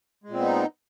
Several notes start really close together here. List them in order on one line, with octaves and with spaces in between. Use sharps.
G#3 A#2 C4 B3 D#4